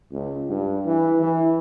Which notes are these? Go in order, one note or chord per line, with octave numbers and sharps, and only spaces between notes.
C#2
G2
E3
E3